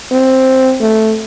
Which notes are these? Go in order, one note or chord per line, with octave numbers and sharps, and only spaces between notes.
C4
A3